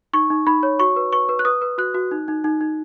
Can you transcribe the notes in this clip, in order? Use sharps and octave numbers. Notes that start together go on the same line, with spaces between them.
D#4 C#6
D#4
D#4 B5
C#5
F#4 C#6
B4
B4 C#6
B4
F#6
B4 D#6
B4
F#4 F#6
F#4
D#4
D#4
D#4
D#4